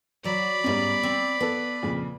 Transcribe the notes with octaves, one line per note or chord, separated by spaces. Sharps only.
F#3 F#4 D5 B5
G#2 G3 B3 C#4 G#5
C4
B3 A4 B4
F2 A#2 C#3